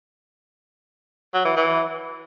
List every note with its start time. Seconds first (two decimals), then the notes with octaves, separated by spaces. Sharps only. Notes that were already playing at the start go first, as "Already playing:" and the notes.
1.34 F#3
1.45 E3
1.56 E3